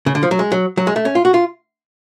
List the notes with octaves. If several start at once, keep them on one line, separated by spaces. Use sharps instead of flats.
C#3
D3
F3
F#3
G#3
F#3
F#3
G#3
A3
C#4
F4
F#4
F4